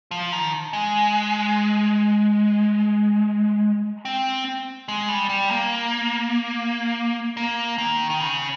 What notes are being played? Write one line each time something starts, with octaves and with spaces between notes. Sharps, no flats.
F3
D#3
G#3
C4
G#3
G3
G3
A#3
A#3
D#3
D#3
C#3